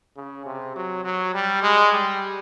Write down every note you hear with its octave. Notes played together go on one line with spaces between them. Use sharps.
C#3
C3
F#3
F#3
G3
G#3
G3